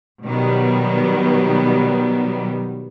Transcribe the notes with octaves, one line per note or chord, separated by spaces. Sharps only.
B2 D#3 F#3 G3 B3